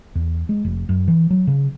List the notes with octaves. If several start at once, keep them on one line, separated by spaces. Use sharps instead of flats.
E2
G#3
F1
F#2
E3
F#3
C#3